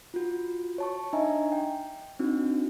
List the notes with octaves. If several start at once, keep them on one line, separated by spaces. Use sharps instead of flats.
F4 F#4
C#5 A5 C#6
D4 D#4 D#5 E5 G#5 A#5
G5
C4 D4 D#4 F#4